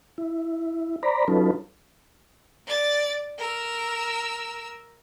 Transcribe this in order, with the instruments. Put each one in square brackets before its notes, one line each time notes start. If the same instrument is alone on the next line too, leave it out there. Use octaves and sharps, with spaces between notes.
[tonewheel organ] E4
C5 D5 A#5 B5
F#3 C#4 D#4 F4 A4 B4
[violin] D5 A6
A#4 E6